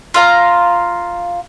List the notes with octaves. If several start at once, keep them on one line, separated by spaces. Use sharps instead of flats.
F4 F5 A#5